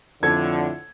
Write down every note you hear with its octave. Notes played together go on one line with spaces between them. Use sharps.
F2 A2 D3 A4 G#6